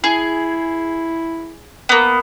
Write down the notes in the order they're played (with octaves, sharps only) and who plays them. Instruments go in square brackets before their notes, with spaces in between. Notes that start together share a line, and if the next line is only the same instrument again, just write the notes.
[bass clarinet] E4 [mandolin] G#4
[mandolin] A#3 B3